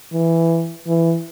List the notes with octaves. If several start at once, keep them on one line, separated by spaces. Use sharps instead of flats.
E3
E3